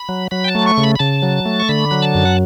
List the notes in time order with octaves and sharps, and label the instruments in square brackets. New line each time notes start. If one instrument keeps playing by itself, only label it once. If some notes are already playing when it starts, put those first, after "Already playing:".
Already playing: [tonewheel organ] B5
F#3
F#3 B5
G5
A5
A3
C#6
C#3
B5
B5
C#3 A5
F#3
A3
C#6
D3 B5
F#3
A5
F#2
F#5